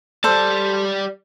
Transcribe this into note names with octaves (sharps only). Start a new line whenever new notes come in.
G3 A4 C5 D5